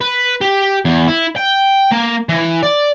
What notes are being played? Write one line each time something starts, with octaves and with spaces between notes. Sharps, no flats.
B4
G4
E2
E4
G5
A#3
E3
D5